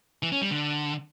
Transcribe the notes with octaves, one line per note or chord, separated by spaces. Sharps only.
E3
C#4
G3
D3